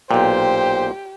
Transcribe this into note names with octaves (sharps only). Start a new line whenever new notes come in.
B1 A#2 G4 C5 G5